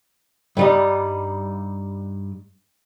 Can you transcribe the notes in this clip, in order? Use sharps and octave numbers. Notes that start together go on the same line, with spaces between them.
G2 G3 D#4